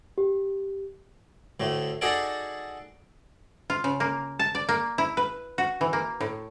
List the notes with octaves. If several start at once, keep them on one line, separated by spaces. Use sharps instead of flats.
G4
D2 A2 A3
D#4 F#4 G#4 A4 D5
F4
C#3
A#3
A5
D5
A#3
E4
B4
F#4
E3
A#3
A2